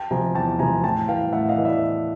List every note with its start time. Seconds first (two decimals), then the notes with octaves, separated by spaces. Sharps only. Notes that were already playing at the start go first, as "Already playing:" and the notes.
Already playing: G5 A5
0.11 C3 F3 G#5 A#5
0.35 E2 G5 A5
0.59 C3 F3 G#5 A#5
0.84 A2 G5 A5
1.08 E3 F5 G5
1.33 A2 E5 F#5
1.49 D#5 F5
1.58 E3
1.65 D5 E5